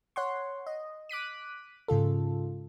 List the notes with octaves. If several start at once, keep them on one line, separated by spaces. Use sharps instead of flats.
C#5 F#5 C6
D#5
D6 F#6 B6 D#7
G#2 C#3 F4 A4